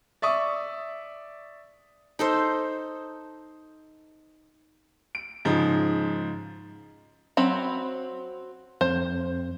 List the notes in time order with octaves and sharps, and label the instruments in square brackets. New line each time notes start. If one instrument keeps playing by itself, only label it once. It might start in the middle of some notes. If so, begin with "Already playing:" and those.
[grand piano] D5 E5 C#6 D#6
[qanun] D#4 A4 C5
[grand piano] D7
G#2 C#3 F3
[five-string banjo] F#3 C4 B5
[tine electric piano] F2 [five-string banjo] C5